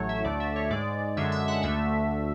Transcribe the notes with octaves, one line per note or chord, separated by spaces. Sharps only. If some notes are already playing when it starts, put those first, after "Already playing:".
Already playing: A1 A2 F#3 A3 C#5
E5
D2 D3 A3 D5
E5
C#5
G#2 G#3 D5
F#2 D3 G#3 E5
E5
F#5
D2 D3 A3 E5